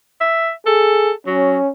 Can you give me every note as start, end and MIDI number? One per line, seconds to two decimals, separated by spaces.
0.21 0.51 76
0.66 1.13 68
0.66 1.12 69
1.27 1.57 54
1.27 1.70 61